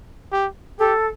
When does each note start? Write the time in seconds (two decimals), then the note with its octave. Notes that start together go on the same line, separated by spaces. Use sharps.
0.33 G4
0.79 G4 A4